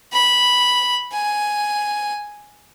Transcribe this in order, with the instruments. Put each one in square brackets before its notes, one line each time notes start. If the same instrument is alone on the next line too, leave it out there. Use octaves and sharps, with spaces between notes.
[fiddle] B5
G#5